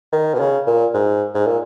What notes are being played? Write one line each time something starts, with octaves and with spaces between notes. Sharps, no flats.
D#3
B2
C#3
A#2
G#2
G#2
A#2